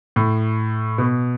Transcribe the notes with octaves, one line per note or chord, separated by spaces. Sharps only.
A2
B2